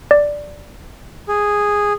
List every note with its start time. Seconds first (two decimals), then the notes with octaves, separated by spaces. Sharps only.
0.11 D5
1.28 G#4